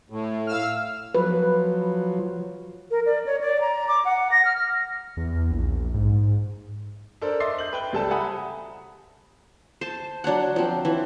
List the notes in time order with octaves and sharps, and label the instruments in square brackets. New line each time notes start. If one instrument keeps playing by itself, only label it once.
[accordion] A2
[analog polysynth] F5 E6 F6
[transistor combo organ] F3 F#3 [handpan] B4
[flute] A#4
D5
C#5
D5
A#5
D6
F#5
A#6
F6
[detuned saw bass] E2
A#1
G#2
[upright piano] D4 A4 A#4 C5 D5
D#5 E5 C6 D6 A6 C7
G6 F#7
B4 G5 G7
C#2 G3 A4 C5 A5
E5 F#5 G#5 A#5 B5 D#6
[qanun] C5 A5
F#3 D4 C#5 F#5
F3 C4
E3